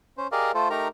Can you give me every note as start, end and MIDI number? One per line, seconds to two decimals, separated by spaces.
0.17 0.27 61
0.17 0.27 72
0.32 0.51 67
0.32 0.51 68
0.32 0.51 70
0.32 0.51 74
0.32 0.51 75
0.32 0.51 77
0.54 0.68 57
0.54 0.68 65
0.54 0.68 69
0.54 0.68 72
0.70 0.88 57
0.70 0.88 63
0.70 0.88 67
0.70 0.88 70
0.70 0.88 82